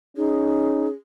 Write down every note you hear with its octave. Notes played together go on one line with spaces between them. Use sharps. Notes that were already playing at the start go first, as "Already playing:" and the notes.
C#4 D#4 G#4